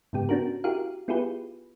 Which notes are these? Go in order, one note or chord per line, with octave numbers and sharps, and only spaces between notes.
G#2 C#3 B3 G4
B3 C#4 D4 F#4 A#4
E4 F#4 G4 A#4 F5
B3 E4 F4 G4 G#4 B4